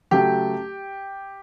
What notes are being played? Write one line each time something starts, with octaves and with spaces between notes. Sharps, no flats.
C#3 F#3 A3 G4